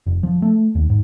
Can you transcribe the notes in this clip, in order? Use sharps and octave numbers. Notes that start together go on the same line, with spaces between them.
F1
F3
A3
D#2
G#2